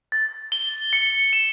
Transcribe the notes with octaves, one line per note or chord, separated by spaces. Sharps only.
A6
G7
C#7
E7